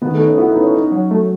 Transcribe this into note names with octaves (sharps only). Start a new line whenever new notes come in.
D#3 B3
A3
D#4
C#4
B3 E4
D#4
B3
C#4
D#4
F#3
A3